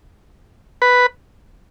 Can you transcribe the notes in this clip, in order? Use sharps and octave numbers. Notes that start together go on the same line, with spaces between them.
B4